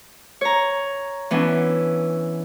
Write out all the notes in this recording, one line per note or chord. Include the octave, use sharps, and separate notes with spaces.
C#5 A#5
E3 B3 C#4 D4